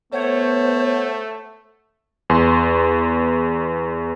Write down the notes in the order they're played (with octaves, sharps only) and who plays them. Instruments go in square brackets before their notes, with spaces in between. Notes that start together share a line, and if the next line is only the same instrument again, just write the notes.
[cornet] A3 [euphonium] B3 [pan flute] C5 [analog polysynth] C#5 F#5
[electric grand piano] E2 C6